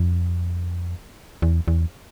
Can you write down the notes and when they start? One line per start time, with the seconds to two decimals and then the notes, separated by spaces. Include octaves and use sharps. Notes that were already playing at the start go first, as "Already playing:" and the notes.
Already playing: F2
1.42 E2
1.68 E2